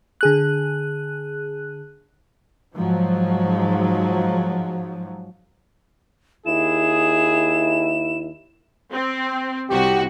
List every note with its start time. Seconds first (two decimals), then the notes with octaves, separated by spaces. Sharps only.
0.21 D3 G#4 F#6
2.77 G#2 F3 F#3
6.46 D#2 E4 G#4 E7
8.91 C4
9.69 C2 F#4 G4